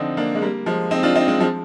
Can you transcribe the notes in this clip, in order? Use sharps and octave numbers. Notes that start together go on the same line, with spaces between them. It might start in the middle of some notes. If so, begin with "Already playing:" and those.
Already playing: D3 F3 C4 D4 D#4
A#3 D4
G#3
G3 A#3
F3 G#3
C4 D#4
D4 F4
C4 D#4
G#3 C4
F3 G#3